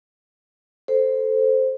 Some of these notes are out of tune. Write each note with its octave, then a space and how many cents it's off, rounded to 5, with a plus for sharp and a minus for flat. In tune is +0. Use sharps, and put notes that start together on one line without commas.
A4 +0 C5 +0